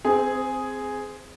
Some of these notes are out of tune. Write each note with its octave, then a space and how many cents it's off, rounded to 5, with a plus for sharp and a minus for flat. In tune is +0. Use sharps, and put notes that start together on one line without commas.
C4 -5 G#4 +0 C5 -45